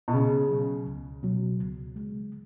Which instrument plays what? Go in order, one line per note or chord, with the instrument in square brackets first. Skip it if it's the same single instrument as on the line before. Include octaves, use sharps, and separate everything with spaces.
[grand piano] B2
[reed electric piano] C#2 [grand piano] C#3
[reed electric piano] B2 F#3
C#2
B2 F#3
C#2
C#3 G#3